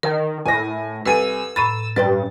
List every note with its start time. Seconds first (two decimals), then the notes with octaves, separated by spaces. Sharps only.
0.03 D#3 A#4
0.46 A2 G#5 A#6
1.06 C2 A4 B4 G#5 E6 D#7
1.56 A2 A#5 B5 A6 D#7 E7
1.96 G2 B4 D5 G5 A6